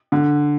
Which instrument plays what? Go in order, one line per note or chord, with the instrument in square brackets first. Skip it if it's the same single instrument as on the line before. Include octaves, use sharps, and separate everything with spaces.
[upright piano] D3